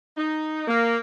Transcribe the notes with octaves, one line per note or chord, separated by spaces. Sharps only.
D#4
A#3